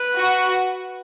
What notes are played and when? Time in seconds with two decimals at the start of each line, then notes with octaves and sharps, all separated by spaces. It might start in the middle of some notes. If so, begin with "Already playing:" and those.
Already playing: B4
0.15 F#4